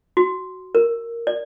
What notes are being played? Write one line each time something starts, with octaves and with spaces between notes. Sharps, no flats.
F#4
A#4
D5